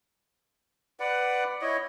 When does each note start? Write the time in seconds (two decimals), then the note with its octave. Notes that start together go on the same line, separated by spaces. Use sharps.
1.00 B4 D5 F#5
1.61 E4 C#5 D#5